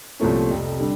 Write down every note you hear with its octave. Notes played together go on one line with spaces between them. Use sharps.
C2 A#2 F3 A3 C#4
F1 F2 C3
D3 G3